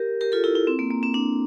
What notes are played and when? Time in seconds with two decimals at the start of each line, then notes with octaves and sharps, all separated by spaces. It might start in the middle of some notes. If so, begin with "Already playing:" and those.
Already playing: G4 A#4
0.21 G4 A#4
0.32 F4 A4
0.44 E4 G4
0.55 E4
0.67 C4
0.79 A#3
0.91 A#3
1.03 C4
1.14 D4